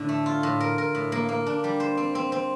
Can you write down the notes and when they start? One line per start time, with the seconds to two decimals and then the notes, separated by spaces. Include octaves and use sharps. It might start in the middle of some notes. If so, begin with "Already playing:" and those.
Already playing: A2 D3 D4
0.09 A3
0.26 F4
0.43 A2
0.60 A#4
0.78 A#4
0.95 A2
1.12 A#3
1.29 A#3
1.46 D4
1.64 G3
1.80 C5
1.97 C4
2.15 C4
2.32 C4